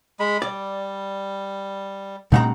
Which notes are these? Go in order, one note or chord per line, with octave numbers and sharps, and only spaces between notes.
G#3 B5
G3 D5
G2 A#2 A3 C4 D#4 F#5 A#5